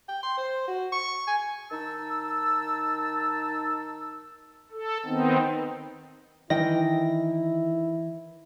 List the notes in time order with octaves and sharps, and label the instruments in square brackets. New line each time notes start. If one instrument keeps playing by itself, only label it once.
[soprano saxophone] G5
C6
C5
F#4
C#6
G#5
[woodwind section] D#3 D#4 A5 E6
[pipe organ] A4
D#3 B3 C4 D#4
[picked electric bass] D#3 [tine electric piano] E3 A#6 [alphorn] E4 [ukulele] D#5 G5